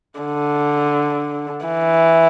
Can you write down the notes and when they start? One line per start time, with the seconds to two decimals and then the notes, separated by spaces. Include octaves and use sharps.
0.20 D3
1.65 E3